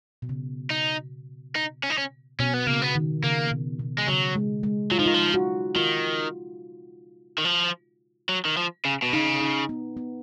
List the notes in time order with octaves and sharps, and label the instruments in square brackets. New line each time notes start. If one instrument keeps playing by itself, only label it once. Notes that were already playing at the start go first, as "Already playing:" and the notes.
[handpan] B2
C#3
[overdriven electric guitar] D#4
D#4
C#4
D#4
C#4
[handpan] B2 [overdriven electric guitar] C#4
[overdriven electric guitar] B3
[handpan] C#3 [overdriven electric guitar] A#3
[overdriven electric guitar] B3
[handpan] D#3
[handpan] C#3 [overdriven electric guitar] A#3
[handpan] B2
B2
[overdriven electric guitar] G#3
[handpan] C#3 [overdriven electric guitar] F#3
[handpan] G#3
G#3
[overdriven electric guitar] F#3 [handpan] F4
[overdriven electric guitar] F3 [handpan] D#4
[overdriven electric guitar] D#3 [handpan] F4
[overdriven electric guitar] F3
[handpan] F#4
[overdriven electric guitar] D#3 [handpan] F4
[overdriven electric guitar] D#3
F3
F#3
D#3
F3
C#3
B2
[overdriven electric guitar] C#3 [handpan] D#4
[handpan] D#4
B3
B3